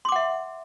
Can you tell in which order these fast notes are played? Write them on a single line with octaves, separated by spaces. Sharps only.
C6 D6 F#5 E5